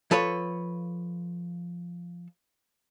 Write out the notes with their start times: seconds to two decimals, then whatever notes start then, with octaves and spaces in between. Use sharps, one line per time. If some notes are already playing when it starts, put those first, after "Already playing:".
0.11 F3 A4 B4 C#5